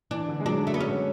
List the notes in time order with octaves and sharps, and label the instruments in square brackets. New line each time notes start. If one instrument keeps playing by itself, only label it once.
[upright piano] E3 [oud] D4
[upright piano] D3
G#3
[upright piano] F#3 [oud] D4
[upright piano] G#3 [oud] A3
[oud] B3
C#4